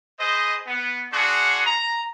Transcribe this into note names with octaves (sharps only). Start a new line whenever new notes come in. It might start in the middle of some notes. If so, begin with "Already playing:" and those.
G#4 B4 C5 D#5
B3
D4 F#4 G#4 F5 F#5 C6
A#5